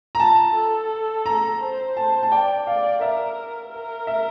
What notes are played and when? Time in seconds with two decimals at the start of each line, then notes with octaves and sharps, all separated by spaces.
0.15 A#5
0.20 F4 A5
0.55 A4
1.26 A#5
1.61 C5
1.97 A5
2.23 A5
2.31 D5 G5
2.66 D5 F5
3.01 A#4 E5
3.72 A#4
4.07 E5